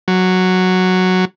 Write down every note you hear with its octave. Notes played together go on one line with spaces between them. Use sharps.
F#3